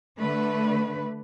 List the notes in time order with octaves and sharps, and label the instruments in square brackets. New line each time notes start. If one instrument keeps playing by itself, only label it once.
[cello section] D3 A3 B4